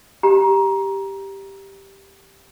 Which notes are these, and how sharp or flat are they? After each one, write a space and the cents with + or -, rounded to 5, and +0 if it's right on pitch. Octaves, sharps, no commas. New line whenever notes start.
G4 +0 A#5 +20